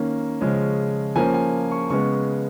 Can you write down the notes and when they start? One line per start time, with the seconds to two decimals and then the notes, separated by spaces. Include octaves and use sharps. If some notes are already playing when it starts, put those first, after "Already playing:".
Already playing: D#3 A#3 C#4
0.41 C#3 F3 G#3 C#4
1.16 F3 A#3 C#4 G#5
1.34 G#5
1.71 C#6
1.90 C#3 G#3 B3 C#6